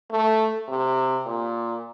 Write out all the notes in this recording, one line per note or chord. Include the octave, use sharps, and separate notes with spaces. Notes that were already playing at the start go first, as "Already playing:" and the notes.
A3
C3
A#2